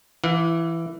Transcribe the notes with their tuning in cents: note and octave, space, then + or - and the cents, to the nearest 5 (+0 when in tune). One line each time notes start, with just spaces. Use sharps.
E3 +10 F5 +45